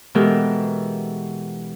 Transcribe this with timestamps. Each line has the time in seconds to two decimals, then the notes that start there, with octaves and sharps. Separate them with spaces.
0.15 B2 E3 G#3 G4 A4 A#4